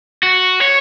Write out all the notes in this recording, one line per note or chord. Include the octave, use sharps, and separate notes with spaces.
F#4
C#5